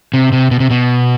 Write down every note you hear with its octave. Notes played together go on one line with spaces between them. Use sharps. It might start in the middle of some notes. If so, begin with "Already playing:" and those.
C3
C3
B2
C3
B2